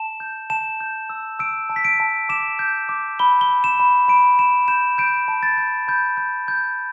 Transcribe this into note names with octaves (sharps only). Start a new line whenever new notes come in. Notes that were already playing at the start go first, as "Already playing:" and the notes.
Already playing: A5 E7
G6
A5 E7
G6
E6
E6 D7
A5
B6
D7
A5
D6 E7
G6
D6
B5 G7
G7
B5
E7
B5
B5 D7
B5 E7
G6 E7
G6 D7
A5
A6
G6
B5 G6
G6
G6